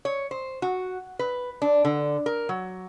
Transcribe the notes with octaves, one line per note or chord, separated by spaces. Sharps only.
C#5
C5
F#4
B4
D4
D3
A#4
F#3